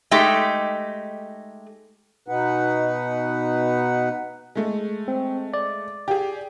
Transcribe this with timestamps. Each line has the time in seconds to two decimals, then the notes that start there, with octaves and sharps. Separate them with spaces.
0.11 G#3 A3 D#4 G4
2.28 B2 D#4 B4 F#5
4.56 G#3 A3
5.08 C4
5.54 D5
6.08 G4 G#4